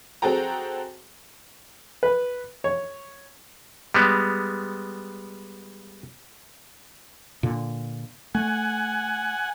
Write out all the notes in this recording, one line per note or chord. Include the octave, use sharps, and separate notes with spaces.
C4 F#4 G#4 A4 G5 A#5
B4
C#5
G3 G#3 B3
A#2 D3
A3 F#5 G#5